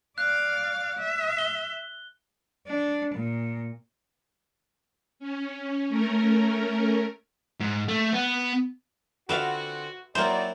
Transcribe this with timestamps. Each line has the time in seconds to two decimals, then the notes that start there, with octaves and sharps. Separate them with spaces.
0.18 D5 F5 F#6
0.99 E5
1.38 G7
2.67 D4
3.15 A#2
5.19 C#4
5.89 A3 C#4 A#4
7.60 G#2
7.89 A3
8.14 B3
9.29 D3 C4 F4 F#4 B4 E5 F5
10.15 F#3 A#3 C4 D#4 E4 F#4 C5 D5